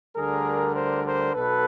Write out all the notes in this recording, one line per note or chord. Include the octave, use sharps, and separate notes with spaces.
D2 D3 G3 G#4 A#4
A#4 C5
A#4 C5
B1 B2 A4 B4